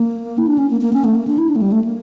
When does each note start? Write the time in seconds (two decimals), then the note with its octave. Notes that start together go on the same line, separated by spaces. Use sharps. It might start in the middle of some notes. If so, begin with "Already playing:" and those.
Already playing: A#3
0.38 E4
0.47 D4
0.58 C#4
0.70 A#3
0.81 A#3
0.93 C#4
1.04 A3
1.15 A#3
1.27 D4
1.38 E4
1.49 D4
1.56 A3
1.62 G3
1.72 A3
1.84 A#3